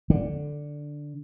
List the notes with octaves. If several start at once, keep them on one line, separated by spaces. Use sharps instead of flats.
D3